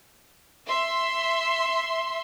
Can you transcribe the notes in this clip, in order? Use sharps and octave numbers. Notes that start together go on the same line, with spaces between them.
E5 C6